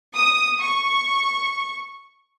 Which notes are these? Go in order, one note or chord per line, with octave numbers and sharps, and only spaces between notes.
D#6
C#6